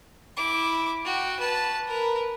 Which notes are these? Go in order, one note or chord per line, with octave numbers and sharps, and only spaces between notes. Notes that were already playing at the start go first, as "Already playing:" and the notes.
E4 D6
F#4 G5
B4 A5
A#4 B4